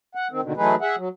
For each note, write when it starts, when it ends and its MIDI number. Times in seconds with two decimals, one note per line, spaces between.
0.15 0.28 78
0.31 0.41 51
0.31 0.41 60
0.43 0.53 39
0.43 0.53 47
0.43 0.53 50
0.43 0.53 51
0.57 0.75 52
0.57 0.75 54
0.57 0.75 57
0.57 0.75 63
0.57 0.75 68
0.57 0.75 71
0.81 0.96 68
0.81 0.96 76
0.81 0.96 78
0.97 1.09 54